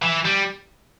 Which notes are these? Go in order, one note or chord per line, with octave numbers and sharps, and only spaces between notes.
E3
G3